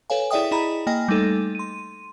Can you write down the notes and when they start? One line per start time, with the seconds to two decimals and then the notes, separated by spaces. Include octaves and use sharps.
0.10 A4 B4 C#5 F5 G#5
0.31 E4 G#4 D5 E5 G5 D#6
0.51 E4 G#4 D#5 A#5 B5
0.87 A#3 D#5 G5 G#5
1.08 G3 A3 D#4 A4
1.55 C6 D#7